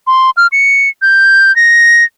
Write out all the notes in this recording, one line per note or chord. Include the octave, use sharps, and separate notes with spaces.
C6
F6
C#7
G6
A#6